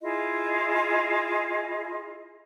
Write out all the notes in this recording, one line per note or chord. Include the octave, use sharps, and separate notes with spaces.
E4 F4 G#4 D#5